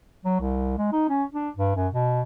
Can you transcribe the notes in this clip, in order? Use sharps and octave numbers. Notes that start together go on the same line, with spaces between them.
F#3
C2
G#3
D#4
C#4
D4
G2
F#2
B2